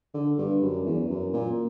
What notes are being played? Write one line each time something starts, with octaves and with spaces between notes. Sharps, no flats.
D3
G2
F#2
E2
F#2
A#2